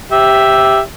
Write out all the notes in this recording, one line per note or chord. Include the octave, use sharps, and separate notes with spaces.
G4 E5